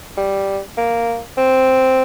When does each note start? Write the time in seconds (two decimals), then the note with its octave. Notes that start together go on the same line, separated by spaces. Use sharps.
0.17 G3
0.77 A#3
1.37 C4